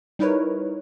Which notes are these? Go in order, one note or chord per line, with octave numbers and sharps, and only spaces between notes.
G3 D#4 E4 A#4 B4 C#5